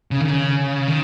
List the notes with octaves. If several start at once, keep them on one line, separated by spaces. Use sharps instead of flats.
C#3
D#3
C#3
D#3